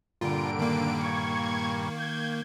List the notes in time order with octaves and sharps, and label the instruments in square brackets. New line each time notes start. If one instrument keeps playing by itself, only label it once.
[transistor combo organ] G2 A#2 [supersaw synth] D3 D7 [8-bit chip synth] F4
[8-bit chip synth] D#3 A#3
[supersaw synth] C#6 G#6
G6 G#6